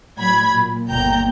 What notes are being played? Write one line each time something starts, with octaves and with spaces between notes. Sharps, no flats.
A2 F#3 B5 G#6
A#2
G1 D#2 G5 A#5 G6